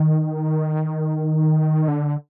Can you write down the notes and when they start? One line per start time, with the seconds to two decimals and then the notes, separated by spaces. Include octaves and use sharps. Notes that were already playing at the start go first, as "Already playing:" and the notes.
Already playing: D#3
1.88 D3